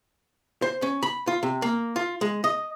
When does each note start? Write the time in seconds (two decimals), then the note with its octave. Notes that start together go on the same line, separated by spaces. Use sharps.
0.62 C5
0.82 C#4
1.03 B5
1.27 F4
1.43 C3
1.62 A#3
1.96 F4
2.21 G#3
2.44 D#5